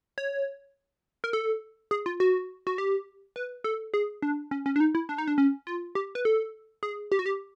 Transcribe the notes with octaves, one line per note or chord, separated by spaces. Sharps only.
C#5
A#4
A4
G#4
F4
F#4
F#4
G4
B4
A4
G#4
D4
C#4
C#4
D4
D#4
E4
D4
D#4
D4
C#4
F4
G4
B4
A4
G#4
G4
F#4
G4